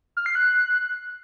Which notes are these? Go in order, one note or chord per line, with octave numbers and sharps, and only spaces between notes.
F6
C7
F#6